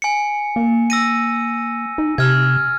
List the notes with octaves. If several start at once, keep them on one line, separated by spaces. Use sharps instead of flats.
G#5 C#7
A#3
E6 A#6 D#7
D#4
C3 F6 G#6